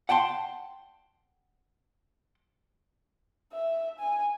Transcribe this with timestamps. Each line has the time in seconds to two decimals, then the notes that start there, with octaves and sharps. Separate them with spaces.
0.09 F#5 G5 A5 C6
3.53 E5
3.99 G#5